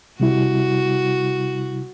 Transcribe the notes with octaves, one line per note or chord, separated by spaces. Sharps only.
C3 G3 E4 F#4